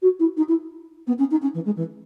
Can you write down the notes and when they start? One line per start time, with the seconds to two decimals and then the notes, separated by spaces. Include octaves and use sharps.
0.02 F#4
0.19 E4
0.37 D#4
0.48 E4
1.07 B3
1.18 C#4
1.31 D#4
1.42 C#4
1.54 E3
1.65 G#3
1.76 E3